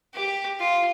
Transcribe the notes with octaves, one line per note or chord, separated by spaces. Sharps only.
G4
F4